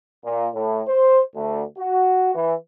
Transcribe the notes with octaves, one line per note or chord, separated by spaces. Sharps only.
A#2
A2
C5
D2
F#4
E3